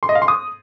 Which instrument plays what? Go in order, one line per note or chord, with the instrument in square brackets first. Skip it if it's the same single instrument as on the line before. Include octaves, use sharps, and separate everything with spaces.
[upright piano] C6
D#5
F5
C6
D#6